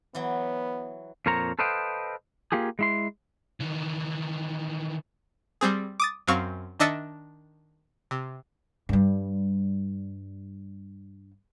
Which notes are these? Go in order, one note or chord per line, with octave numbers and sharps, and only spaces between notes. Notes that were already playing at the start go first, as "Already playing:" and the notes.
E3 F#3 B3
F2 A#2 A#4 C5 C#5 A#5
A4 B4 C5 D#5 F5 G5
A#3 F4 G4 G#4
G#3 E4 C6
D#3 E3
G3 C4 G#4
D6 D#6 A6
F#2 F#3 C4 F5 C#6
D#3 D4 D#5 E5 A6 C#7
C3
G2 G3